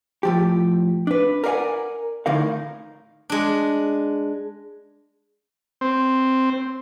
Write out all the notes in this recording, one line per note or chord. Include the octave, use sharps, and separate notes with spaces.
A2 F3 G4
D4 B4
A#4 B4 D5 F5 F#5 G#5
A2 D3 D#4 A#4 F5
G#3 D4
C4